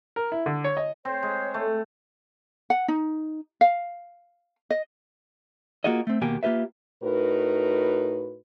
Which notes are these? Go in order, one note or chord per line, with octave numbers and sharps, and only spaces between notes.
A#4
E4
D3
C#5
D#5
C4 C5 C#5
G#3
A3
F#5
D#4
F5
D#5
A#3 F4 F#4 G#4 D#5
A3 C4
D#2 B2 A#3 G4 G#5
A#3 F4 G4 B4 E5
A2 D#4 F#4 A#4 B4